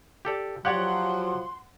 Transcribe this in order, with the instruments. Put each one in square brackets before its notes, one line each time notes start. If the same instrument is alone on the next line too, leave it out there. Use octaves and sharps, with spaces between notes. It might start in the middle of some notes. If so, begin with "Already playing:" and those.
[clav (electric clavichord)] G4 A4 D5
[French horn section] F3 F#3 [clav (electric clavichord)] G4 C#5 D5 [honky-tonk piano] F#5 [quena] C6